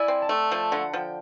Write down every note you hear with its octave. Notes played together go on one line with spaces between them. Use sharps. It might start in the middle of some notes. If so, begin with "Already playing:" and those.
Already playing: E4 D5 G#5
C4
A5
A3
F3 A5
D3 F#5
F3 G5